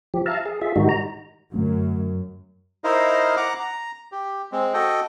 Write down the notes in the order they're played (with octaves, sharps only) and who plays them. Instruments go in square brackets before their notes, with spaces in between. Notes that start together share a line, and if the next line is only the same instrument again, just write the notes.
[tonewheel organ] F3 G4
E5 F5 A5 A#5
G#4
F4 G#4 E5
G#2 D#3 G3 D#4 F#4
A#5
[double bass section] F#2 [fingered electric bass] D3 A3 C#4
[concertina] D#4 E4 A#4 C5 D#5 F5
F#5 A#5 D6
A#5
G4
G#3 C4
F#4 A4 D#5 G5